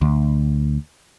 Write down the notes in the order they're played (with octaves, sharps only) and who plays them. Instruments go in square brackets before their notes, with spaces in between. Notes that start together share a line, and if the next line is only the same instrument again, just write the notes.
[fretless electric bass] D2